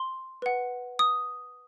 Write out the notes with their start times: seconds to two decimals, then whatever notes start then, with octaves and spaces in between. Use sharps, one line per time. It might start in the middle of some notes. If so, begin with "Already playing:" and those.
Already playing: C6
0.42 B4 F#5
0.99 D#6